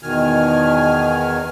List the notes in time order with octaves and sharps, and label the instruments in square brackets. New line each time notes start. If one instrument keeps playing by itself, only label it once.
[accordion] E2 B2 D#3 G#5 F6